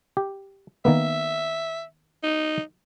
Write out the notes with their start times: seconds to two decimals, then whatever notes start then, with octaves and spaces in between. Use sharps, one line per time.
0.17 G4
0.85 D#3 A#3 B3 E5
2.23 D#4